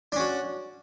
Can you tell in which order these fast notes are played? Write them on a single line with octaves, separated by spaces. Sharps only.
D4 C#4 F#4